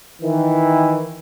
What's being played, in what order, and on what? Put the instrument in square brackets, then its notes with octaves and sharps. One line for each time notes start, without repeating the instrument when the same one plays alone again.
[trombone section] D#3 E3